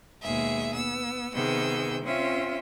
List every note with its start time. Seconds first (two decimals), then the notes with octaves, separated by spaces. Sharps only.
0.23 D#2 B2 G#3 G#4 E5
0.75 B3 E6
1.33 C3 D#3 B3 G#4 E6 G6
2.03 C4 C#4 F4 E5